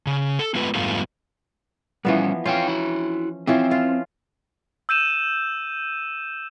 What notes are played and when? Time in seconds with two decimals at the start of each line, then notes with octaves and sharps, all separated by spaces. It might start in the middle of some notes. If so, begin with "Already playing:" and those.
0.07 C#3
0.39 A4
0.55 G#3 A3 B3 F4 B4
0.75 F2 G#2 G3 A3 B3 F4
2.05 E3 F3 G3 B3 C#4
2.46 C#4 F4 C5 F5 G5
2.68 E4 F#4
3.47 E3 F3 C4 C#4
3.71 F4
4.89 E6 G6 D#7 E7